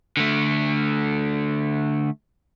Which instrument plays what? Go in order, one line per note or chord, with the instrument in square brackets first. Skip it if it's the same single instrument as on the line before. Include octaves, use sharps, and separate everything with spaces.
[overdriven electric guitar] D3 A3